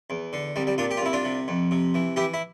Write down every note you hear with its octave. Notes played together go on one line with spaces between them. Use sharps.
E2
D3
C2 G3
G3
A#2 D4 F4
G4
F4
C2 E4
D4 F4
C3
F2
C3
E3
E3 E4 G4
E4